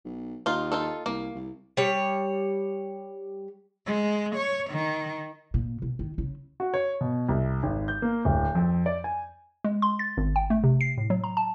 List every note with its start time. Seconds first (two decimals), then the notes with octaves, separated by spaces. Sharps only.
0.05 B1
0.46 D#2 D#4 F4
0.72 D#4 F4 A4
1.06 C2 A#3
1.35 C2
1.77 G3 C#5
3.86 G#3
4.36 C#5
4.71 D#3
5.54 A#2
5.82 B2
5.99 D#3
6.18 C#3
6.60 F#4
6.74 C#5
7.01 B2
7.29 C2
7.63 G#1
7.88 G6
8.02 A#3
8.25 D1
8.55 F2
8.86 D5
9.04 G#5
9.64 G#3
9.82 C6
9.99 A6
10.17 G#1
10.36 G5
10.50 A3
10.64 C3
10.81 C7
10.98 A2
11.10 F#3
11.24 A#5
11.37 A5